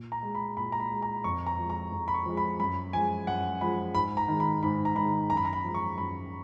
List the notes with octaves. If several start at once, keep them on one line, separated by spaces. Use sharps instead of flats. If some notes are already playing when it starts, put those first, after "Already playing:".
Already playing: A#2
A#5
G#3
B5
A#2 B5
A#5
B5
G#3
A#5
F2 C#6
A#5
F3 G#3
A#5
F2
B5
C#6
F3 G#3
B5
F#2 B5
F3 G#3 G#5
F#2 F#5
F3 G#3 B5
G#2 B5
A#5
D#3 G#3
B5
G#2 B5
A#5
D#3 G#3 B5
F#2 A#5
B5
A#5
B5
F3 G#3
C#6
F#2 B5